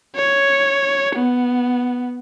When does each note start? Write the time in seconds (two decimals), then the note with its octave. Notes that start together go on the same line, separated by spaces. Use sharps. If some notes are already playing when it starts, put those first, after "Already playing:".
0.16 C#5
1.15 B3